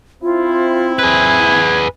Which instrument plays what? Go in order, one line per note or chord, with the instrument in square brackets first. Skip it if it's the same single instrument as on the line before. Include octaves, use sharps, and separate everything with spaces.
[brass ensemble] C4 E4 [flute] F4
[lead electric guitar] G#4 B4 [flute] G#6